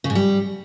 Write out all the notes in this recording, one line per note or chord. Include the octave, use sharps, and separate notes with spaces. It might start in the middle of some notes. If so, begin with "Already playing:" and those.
C#3
G#2
G3